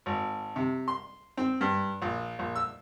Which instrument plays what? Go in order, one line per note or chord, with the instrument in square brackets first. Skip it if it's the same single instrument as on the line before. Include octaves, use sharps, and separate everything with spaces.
[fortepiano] G#1
C3
C6
C4
G2
A#1
A#1
E6